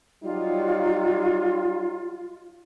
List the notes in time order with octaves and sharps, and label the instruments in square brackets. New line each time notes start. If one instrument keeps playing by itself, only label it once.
[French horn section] F#3 G3 D#4 [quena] F4